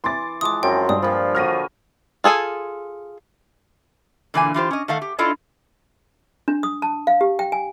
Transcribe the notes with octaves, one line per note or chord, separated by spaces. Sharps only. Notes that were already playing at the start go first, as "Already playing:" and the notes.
E3 C6 D6 A6
E3 F3 G#3 D6 D#6
F#2 F3 C4 G5
G2 D4 D#6
A#2 F3 B5
D3 F#3 C#5 F6 A#6 D#7
F4 G#4 A4 G#5
A#2 D3 E3 A#3 D#4 G#5
E3 F4 G4 C5
C#4 D#5
D#3 A3 A4 F5 F#5
G4
D4 E4 F4 A4 D#5
D4
D#6
A5
F5
G4
G5
G#5